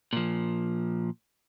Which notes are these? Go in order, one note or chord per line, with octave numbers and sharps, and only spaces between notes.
A#2 F3